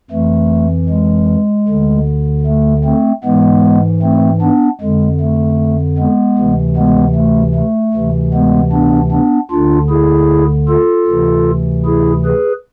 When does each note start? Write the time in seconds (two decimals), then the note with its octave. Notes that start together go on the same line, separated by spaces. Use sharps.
0.11 F2 E3 A3
0.89 G#3
1.68 D2 D3
2.46 A3
2.85 A3 C4
3.24 G#2 E3 G#3 B3
4.02 A3 C4
4.41 B3 D4
4.81 F2 D3 G#3
5.21 A3
5.98 G#3 B3
6.37 D2 C3 E3
6.77 G#3 B3
7.16 A3
7.55 A3
7.94 D2 C3 E3
8.33 G#3 B3
8.72 B3 D4
9.12 B3 D4
9.51 D2 D3 D4 F4
9.90 E4 G#4
10.68 F4 A4
11.08 D2 C3 E3
11.86 E4 G#4
12.25 G#4 B4